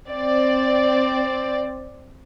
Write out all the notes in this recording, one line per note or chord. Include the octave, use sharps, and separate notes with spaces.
C4 D5